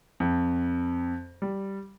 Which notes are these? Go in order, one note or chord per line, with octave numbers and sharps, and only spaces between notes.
F2
G3